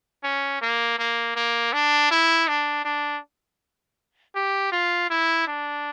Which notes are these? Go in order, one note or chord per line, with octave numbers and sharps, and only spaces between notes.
C#4
A#3
A#3
A#3
D4
E4
D4
D4
G4
F4
E4
D4